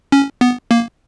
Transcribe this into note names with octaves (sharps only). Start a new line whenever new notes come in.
C#4
B3
A#3